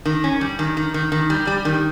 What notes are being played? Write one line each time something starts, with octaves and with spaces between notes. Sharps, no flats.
D#3
C#4
G3
D#3
D#3
D#3
D#3
G3
G3
D#3